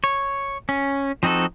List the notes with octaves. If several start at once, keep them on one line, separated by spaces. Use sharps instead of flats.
C#5
C#4
F3 C4 D#4 F#4 A4